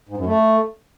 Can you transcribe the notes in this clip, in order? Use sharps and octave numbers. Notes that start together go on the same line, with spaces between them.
G#2
F#2
A3